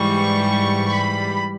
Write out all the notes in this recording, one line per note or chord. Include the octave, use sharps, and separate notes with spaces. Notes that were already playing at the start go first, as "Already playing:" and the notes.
Already playing: G#2 E3 G3 C#6
B5